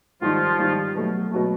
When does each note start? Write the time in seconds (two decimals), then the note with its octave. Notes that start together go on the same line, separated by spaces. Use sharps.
0.21 G#2 D#3 F3 G3 F4
0.59 G#2 D#3 G3
0.95 B2 F#3 A3
1.31 B2 F#3 A3